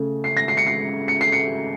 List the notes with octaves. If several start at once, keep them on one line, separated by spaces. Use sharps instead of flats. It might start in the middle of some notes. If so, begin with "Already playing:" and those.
Already playing: C#3 A3
C7
A#6
C7
C#7
C7
C#7
C7
C#7